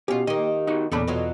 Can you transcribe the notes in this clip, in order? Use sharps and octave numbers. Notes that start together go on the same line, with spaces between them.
B2 C#4 F4 G4
D#3 A#3 D#5
D#4 F#4
E2 A#2 C#3 D4 A4 B5
B2 F#3 F4